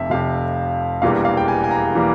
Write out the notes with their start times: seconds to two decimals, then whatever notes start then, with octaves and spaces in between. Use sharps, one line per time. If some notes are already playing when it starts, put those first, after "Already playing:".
Already playing: F1 F2 C3 E5 F5
0.10 F1 F2 C3 F5
1.02 E1 E2 E3 G3 A#3 F5
1.25 F5
1.37 G5
1.48 G#5
1.64 G#5
1.71 A#5
1.95 E3 G3 A#3